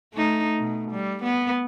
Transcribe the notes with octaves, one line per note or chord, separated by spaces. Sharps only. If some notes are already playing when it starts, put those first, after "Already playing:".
A3 D#4
B2
G3
B3